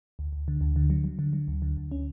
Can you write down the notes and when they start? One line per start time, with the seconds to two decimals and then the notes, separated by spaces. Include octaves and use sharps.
0.19 D2
0.33 D2
0.48 D3
0.61 D2
0.76 D3
0.90 F#3
1.04 F#3
1.19 D3
1.33 F#3
1.48 D2
1.62 D3
1.77 D2
1.91 C#4